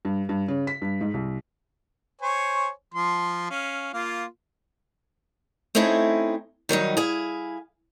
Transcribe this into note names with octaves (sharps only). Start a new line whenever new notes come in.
G2
G2
C#3
B6
G2
G#2
C2
C5 C#5 G#5
F3 C6
C#4 F5
A#3 F4 F5
A3 C4 C#4 D#4 E4 G#4
D#3 F#3 G3 D#4
E4 G#4 F5